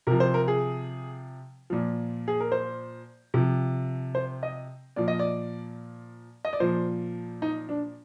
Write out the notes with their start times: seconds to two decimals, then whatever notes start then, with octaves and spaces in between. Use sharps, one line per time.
0.07 C3 F3 A#4
0.20 C5
0.34 A#4
0.48 G#4
1.70 A#2 F3
2.28 G#4
2.40 A#4
2.52 C5
3.34 C3 F3
4.15 C5
4.43 D#5
4.96 A#2 F3 D5
5.08 D#5
5.19 D5
6.45 D#5
6.53 D5
6.60 A#2 F3 C5
7.42 D#4
7.69 D4